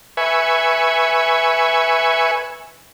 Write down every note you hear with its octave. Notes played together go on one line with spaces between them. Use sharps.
B4 E5 G#5 C#6